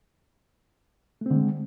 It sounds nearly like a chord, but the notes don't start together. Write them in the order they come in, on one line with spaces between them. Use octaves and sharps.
A3 C4 D3 G#3